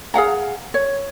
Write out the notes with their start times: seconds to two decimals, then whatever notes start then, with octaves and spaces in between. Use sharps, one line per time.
0.14 G#4 F5 F#5 A#5
0.74 C#5